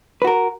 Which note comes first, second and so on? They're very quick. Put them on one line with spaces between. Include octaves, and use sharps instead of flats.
B4 F#4 A#4